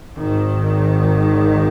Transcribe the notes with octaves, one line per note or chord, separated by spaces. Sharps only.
G#1 G#2 D#3